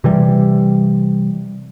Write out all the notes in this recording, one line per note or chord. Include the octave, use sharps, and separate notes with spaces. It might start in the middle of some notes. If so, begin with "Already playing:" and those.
C3 E3 G3